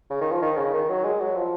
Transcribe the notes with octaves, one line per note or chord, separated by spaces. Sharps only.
C#3
D#3
F3
D#3
C#3
D#3
F#3
G#3
F#3
F3